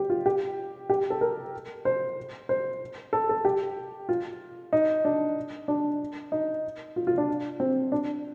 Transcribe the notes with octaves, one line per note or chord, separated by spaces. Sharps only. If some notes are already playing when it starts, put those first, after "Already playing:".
Already playing: G4
F4
G4
G4
A4
A#4
C5
C5
A4
A4
G4
F4
D#4
D4
D4
D#4
F4
F4
D4
C4
D4